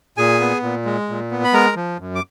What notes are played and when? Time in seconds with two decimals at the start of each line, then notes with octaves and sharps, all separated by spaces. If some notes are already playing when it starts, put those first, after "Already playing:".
0.17 A#2 G#4 G#5
0.41 B3
0.63 A#2
0.85 G#3
1.09 A#2
1.31 B3
1.44 B5
1.53 G#3 A#4 A#5
1.76 F3
1.99 F#2
2.15 D6